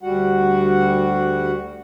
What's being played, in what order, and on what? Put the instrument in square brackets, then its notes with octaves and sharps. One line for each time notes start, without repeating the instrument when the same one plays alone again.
[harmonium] D2 G3 F#4 F#5